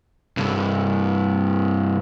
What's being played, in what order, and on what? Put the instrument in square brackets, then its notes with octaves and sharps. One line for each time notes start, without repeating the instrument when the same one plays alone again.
[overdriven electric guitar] C2 G2